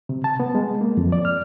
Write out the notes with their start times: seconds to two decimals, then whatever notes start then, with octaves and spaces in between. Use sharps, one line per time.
0.09 C3
0.24 A5
0.40 B3
0.55 G#3
0.81 A#3
0.97 F2
1.12 D5
1.25 F6